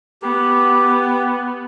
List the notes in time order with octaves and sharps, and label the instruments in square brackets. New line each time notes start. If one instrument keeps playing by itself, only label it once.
[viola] B3 [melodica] G4